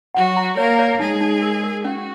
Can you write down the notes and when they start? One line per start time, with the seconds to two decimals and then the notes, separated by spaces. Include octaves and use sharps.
0.15 F#3 F#4 F#5
0.37 A#5
0.57 A#3 A#4 C#5
0.79 C#5
1.00 G#3 D#4 G#4
1.21 D#4
1.42 A#4
1.63 A#4
1.84 C#4 F#4